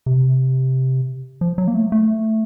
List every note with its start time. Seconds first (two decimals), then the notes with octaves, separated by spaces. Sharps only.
0.06 C3
1.41 F3
1.58 F#3
1.68 A#3
1.74 A3
1.92 A3